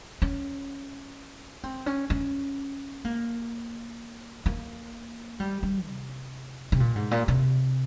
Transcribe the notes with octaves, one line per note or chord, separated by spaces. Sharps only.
C#4
C4
C#4
C#4
A#3
A#3
G3
G3
C3
C3
A#2
G#2
A#2
C3